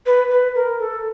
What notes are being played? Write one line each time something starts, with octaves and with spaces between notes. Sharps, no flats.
B4
B4
A#4
A4